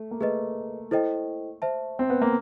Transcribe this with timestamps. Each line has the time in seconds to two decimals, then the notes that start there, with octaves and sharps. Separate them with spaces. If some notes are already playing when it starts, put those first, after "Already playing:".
Already playing: A3
0.11 A#3
0.21 A3 G#4 B4 D#5
0.91 E4 A4 C5 D#5 G5
1.62 C5 E5 A5
1.99 C4
2.10 B3
2.22 A#3